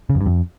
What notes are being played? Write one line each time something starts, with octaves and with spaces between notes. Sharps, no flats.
C#3
F2
G2
F2